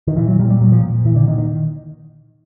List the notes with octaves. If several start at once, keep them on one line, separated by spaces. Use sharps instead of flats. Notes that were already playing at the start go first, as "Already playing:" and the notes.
D#3
A#2 E3
F#3
A#2 G3
G3
A#2 F#3
F3
A#2
A#2 E3
D3
A#2 D#3
D#3